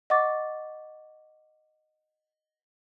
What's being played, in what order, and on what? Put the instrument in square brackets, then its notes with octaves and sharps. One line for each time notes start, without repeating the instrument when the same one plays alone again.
[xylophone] D#5 F#5 C#6 D6 A6